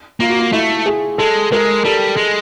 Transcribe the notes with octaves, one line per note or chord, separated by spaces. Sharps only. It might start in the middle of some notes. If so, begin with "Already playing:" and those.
A#3 F4
F#4
F4
A3 E4
G#4
G#3 A4
G#3 A#4
G3 A4
G#3